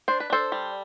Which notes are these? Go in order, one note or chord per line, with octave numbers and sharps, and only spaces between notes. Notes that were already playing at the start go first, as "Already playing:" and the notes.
D4 C5
B4
D4 A4 C5
G3